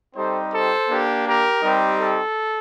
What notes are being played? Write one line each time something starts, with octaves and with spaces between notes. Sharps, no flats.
G3 C4 D#4 G4 A4 C5
A4 C5
A#3 D4 G4
G4 A#4
G3 C4 D#4 G4
A4